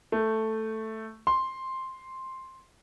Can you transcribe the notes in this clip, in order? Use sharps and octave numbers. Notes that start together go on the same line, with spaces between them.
A3
C6